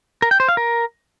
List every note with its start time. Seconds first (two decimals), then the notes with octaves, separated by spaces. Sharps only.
0.22 A#4
0.31 G5
0.40 C5
0.48 F5
0.57 A#4